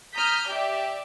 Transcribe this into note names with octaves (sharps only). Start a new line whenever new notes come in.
A#5 D#6 F6 G6 B6
G4 D5 E5